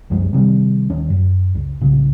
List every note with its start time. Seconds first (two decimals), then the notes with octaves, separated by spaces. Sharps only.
0.10 C2 F#2 F3 G#3
0.33 C3 D#3 G3
0.90 D#2 D#3 C#4
1.10 F#2
1.55 C#2
1.81 B1 A2 C#3